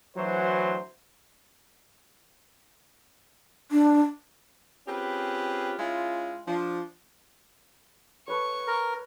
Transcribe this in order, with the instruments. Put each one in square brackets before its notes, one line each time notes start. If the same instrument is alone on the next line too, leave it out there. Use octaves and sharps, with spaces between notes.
[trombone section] D2 E3 F#3 E4 F#4 C5
[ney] D4
[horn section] C4 C#4 F4 G4 G#4 B4
G#3 C#4 E4 F4
F3 D4
[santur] A4 B4 C#5 [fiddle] C#6
[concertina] A#4